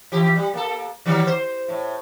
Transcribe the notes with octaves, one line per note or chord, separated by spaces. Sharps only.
E3 G4
G3
A#3 A4
D#3 F#3 G3
C5
A2